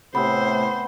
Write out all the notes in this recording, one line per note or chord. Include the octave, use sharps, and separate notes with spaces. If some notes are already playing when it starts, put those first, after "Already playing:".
A2 C3 B3 C4 C5 B5